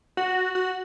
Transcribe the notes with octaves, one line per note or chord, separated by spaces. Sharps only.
F#4
F#4